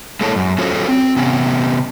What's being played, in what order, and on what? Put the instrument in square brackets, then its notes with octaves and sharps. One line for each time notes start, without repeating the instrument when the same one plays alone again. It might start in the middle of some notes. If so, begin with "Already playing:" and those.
[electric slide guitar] G#3 A#3 E4 A4 C#5 A5
F#2
C#4 F4 F#4 A4 C5 C#5
C4
C3 B3 C#4